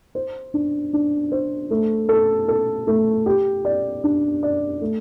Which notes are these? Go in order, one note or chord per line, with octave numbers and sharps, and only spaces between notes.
C5
D4
D4
C5
A3
A4
A4
A3
G4
D5
D4
D5
A3